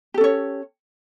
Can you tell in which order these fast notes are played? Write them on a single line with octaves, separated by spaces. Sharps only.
G4 A4 C#4 C#5